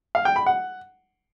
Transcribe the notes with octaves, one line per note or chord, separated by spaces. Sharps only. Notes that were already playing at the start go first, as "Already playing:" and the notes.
F5
G5
B5
F#5